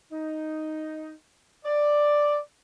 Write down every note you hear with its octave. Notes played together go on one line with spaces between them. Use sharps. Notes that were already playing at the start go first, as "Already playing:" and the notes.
D#4
D5